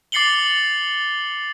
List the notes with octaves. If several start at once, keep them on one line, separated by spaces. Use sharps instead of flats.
D6 A6 C7 C#7 F#7 G7